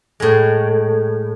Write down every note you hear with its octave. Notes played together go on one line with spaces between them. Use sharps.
A2 G#3